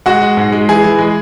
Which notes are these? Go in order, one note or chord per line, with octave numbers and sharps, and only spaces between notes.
G#3 F#4 F#5
G#3
G#2
G#3
E3 G#4 G#5
E3
G#3